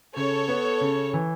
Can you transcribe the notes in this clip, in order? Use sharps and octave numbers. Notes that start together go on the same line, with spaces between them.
C#3 A4 C#5
B3
C#3
E3